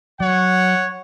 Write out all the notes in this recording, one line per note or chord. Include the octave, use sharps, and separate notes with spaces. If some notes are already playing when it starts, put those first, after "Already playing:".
F#3 C#5 F#5